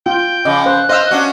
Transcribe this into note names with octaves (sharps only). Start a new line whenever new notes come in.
F4 G5
C#3 F3 D#5 D6
C5 F#6
F4 C5 D#5 F5 E6
C#4 D4 F#4